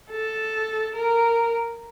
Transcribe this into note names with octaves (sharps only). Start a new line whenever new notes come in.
A4
A#4